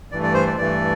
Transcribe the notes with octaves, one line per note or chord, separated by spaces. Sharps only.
G2 E3 A3 D5
D5
C5
D5
G2 E3 A3 D5